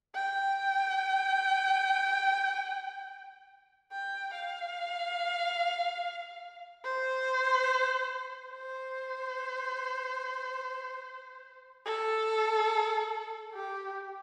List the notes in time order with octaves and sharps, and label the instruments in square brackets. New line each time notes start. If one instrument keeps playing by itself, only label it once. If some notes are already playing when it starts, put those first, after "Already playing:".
[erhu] G5
G5
F5
C5
C5
A4
G4